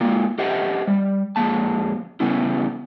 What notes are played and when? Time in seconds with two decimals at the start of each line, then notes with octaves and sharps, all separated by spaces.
0.01 G#3 A#3 F4
0.38 G4 C5 D#5 E5 F#5
0.87 G3
1.36 F2 G#3 A#3 A5
2.20 C#3 G3 B3 C#4 E4